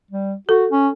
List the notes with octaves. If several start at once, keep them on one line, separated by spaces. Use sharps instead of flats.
G3
F#4 A4
C#4